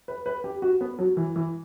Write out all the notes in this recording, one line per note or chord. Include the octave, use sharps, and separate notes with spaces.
B4
B4
G4
F#4
B3
F#3
E3
E3